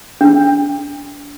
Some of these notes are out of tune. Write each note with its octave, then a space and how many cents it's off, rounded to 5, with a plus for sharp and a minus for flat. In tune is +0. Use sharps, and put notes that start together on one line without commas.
D4 -30